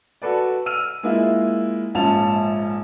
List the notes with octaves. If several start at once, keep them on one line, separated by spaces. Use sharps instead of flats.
F#4 A4 B4 D5
E6 F6 D#7
G#3 A#3 E4 F4
A#1 G#2 C#4 F4 A5 F7